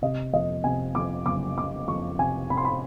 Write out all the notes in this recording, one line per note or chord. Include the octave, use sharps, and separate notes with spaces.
C3 D#5
F2 D#5
C3 G#5
F2 D6
F#1 D6
F#1 D6
F2 C#6
C3 G#5
C3 B5
C6
B5